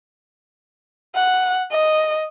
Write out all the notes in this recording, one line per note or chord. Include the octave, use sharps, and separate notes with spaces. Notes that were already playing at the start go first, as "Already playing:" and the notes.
F#5
D#5